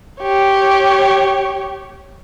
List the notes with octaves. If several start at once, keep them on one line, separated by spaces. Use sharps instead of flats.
G4 C#5